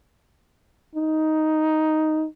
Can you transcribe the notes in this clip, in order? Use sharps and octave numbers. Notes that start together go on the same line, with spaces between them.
D#4